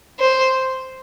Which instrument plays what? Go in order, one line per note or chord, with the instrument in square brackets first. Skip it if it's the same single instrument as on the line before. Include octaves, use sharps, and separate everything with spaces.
[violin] C5